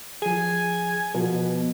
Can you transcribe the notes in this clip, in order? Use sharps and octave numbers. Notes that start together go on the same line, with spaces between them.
F3 G#4 G#5
B2 F3